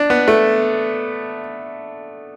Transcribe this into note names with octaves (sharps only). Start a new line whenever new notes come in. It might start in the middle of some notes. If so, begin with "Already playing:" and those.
Already playing: D4
B3
A3